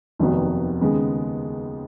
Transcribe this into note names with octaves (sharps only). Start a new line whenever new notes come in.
F1 D#2 D#3 F#3 B3
D#2 C#3 G#3 B3